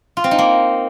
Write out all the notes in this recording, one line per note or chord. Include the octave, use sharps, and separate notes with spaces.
F4
C4
D#4
A#3